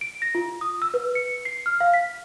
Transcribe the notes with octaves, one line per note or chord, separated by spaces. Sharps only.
D7
A#6
F4
D#6
E6
B4
C#7
C7
F6
F5
B6